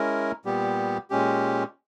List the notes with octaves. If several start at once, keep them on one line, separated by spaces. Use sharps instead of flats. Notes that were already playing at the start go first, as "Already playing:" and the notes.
Already playing: G#3 C#4 E4 A#4
A#2 G3 B3 G4
A#2 G#3 C#4 G4